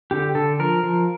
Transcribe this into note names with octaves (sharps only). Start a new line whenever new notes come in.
D3 G4
D3 A4
F3 A#4
F3